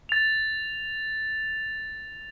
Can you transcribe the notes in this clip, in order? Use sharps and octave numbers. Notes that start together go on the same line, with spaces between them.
A6 F7